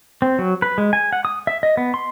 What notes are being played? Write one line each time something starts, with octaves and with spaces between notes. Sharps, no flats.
C4
F#3
B4
G#3
G#5
F#5
D#6
E5
D#5
B3
C6